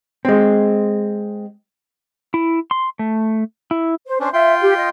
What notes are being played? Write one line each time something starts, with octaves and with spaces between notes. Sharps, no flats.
G#3 C4
E4
C6
A3
E4
C5
C#4 D4 C5
F4 E5 G5 C6
G4
D#5